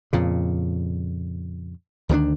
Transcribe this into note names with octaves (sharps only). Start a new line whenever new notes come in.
F2 A#2 C#3
D2 D#3 F3 D4